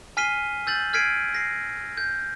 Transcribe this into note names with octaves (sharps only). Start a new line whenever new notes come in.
G#5 F6 B6 C7 D#7 G7
E6 G6 A6 F#7
F6 G#6 B6 C7 D7 D#7
A#6 C7
G6